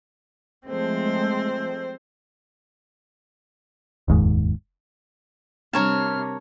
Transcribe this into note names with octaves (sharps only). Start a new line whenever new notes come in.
F3 G#3 A3 C4 C5
F1 D#2 G#2
C3 G3 D4 A#4 C#5 A5 F6